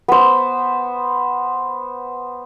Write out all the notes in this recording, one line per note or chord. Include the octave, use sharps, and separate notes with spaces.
B3 C5